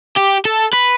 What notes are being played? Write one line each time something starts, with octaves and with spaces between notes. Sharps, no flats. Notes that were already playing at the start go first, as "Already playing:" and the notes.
G4
A4
B4